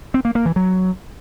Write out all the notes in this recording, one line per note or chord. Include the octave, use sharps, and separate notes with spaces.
C4
A#3
A#3
E3
F#3